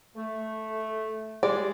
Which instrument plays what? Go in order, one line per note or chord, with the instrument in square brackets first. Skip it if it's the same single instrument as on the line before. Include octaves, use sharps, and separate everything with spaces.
[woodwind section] A3
[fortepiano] G3 G#3 [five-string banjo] D5